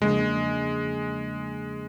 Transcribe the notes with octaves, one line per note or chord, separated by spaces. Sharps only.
E2 C#3 F3 G#3 A#3 D4